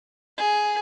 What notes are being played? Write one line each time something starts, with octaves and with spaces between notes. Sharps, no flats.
G#4